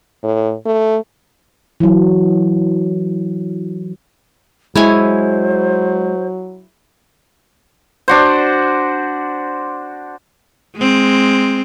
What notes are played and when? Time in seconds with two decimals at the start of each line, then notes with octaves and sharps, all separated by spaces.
0.23 A2
0.66 A3
1.80 E3 F#3
4.76 F#3 G#3 E4 C5 C#5 G#5
8.08 D4 F#4 C5
10.77 G#3 C4